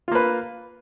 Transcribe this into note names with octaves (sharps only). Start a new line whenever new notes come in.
A#3 F4 B4